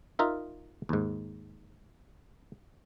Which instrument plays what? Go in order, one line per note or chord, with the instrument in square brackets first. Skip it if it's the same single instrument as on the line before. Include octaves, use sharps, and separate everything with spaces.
[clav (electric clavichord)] D#4 F4 A#4 E5
D#2 G#2